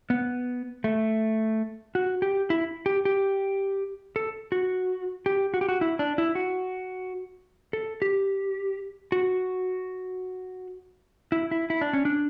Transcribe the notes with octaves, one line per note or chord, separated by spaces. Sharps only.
B3
A3
F#4
G4
E4
G4
G4
A4
F#4
G4
F#4
G4
F#4
E4
D4
E4
F#4
A4
G4
F#4
E4
E4
E4
D4
C#4
D4